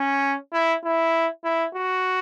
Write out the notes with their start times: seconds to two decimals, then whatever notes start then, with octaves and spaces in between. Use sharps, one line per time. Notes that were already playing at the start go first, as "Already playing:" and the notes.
Already playing: C#4
0.53 E4
0.84 E4
1.44 E4
1.75 F#4